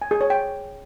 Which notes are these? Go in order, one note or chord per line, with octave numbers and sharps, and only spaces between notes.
G#5
G#4
C#5
G5